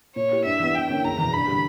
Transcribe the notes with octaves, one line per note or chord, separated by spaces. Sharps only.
A#2 C#5
A#3 E4 G4
G2 E5
E3 B3
G2 G5
D3 A#3 C#4 E4
F#1 A#5
E2 B2
G2 B5
D3 G3